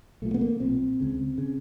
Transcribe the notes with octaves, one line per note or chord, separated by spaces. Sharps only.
B1 A#2 A3
B3
A#3
B1 A#2 C4
C#2 C#3
C#3